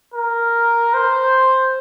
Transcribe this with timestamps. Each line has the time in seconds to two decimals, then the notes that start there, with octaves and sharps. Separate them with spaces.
0.14 A#4
0.94 C5